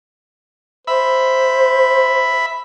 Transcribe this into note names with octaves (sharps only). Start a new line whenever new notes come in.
C5 E5 B5